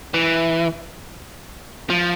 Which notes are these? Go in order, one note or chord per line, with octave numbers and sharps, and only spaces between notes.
E3
F3